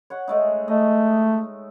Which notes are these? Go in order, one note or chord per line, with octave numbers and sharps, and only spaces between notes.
C#5 F#5
G#3 A3 D#4
A3 D#5